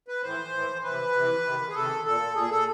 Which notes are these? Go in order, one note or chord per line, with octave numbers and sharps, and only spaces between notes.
B4
A2 E3 C5
A2 E3
C3 E3 B4
C3 E3
C3 D#3
G#4
C3 D#3 A4
A#2 A4
A#2 G#4
A4